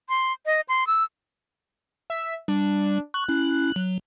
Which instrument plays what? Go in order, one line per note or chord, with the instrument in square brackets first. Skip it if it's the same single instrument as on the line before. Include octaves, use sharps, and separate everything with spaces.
[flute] C6
D#5
C6
E6
[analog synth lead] E5
[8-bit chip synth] G3 [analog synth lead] D4
[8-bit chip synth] C#6 [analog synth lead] F#6
[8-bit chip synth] C#4 E4 [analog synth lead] F#6
[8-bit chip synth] F#3